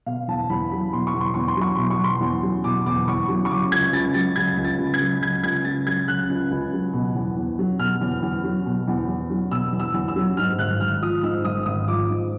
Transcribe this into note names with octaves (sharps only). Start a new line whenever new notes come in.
B2 F5
E2 A5
E2 B5
F#3 B5
B2 C6
C#6
E2
C6
E2 C#6
C6
F#3 C#6
B2 C6
C#6
E2 C6
E2
F#3
B2 D6
E2 D6
E2 C#6
F#3
C#6
C#3 D6
C#2 G#6
C#2 A6
F#3 A6
C#3 G#6
C#2
A6
C#2
G#6
F#3
C#3 G#6
C#2 G#6
C#2 A6
F#3 G#6
C#3 F#6
C#2
C#2
F#3
B2
E2
E2
F#3
B2 F6
E2
E2
F#3
B2
E2
E2
F#3
B2 E6
E2
E6
E2
E6
F#3
G#2 F6
G#1 F#6
G#1 F6
F3 D#6
G#2 E6
G#1 D#6
G#1 D#6
F3 D6
G#2